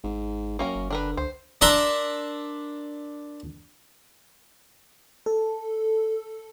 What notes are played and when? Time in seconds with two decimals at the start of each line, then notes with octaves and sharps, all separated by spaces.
0.04 G#1 G#2
0.59 F#2 A#3 C#4 A#4
0.75 F#1
0.90 D3 D4 A#4 B4
1.17 C#2 C5
1.61 D4 A#4 E5 A#5 C6
5.26 A4